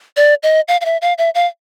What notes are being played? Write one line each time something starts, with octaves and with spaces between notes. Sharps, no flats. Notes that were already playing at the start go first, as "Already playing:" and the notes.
D5
D#5
F5
F5
E5
F5
E5
F5